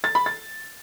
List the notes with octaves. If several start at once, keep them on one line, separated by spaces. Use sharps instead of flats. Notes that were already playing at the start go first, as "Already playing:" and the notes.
A6
B5
A6